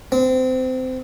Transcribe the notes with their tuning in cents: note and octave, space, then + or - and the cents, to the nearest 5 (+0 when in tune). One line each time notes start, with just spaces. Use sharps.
C4 -25